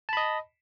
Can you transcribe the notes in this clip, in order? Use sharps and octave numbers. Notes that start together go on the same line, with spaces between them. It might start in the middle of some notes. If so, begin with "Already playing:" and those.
D#5 A5 B5